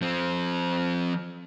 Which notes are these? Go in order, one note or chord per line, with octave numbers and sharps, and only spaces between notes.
F3 C4